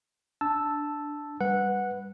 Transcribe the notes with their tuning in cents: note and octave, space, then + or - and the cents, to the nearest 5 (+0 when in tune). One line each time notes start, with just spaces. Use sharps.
D4 +0 A5 +0 E6 +0
G3 +10 B4 +0 F#5 -10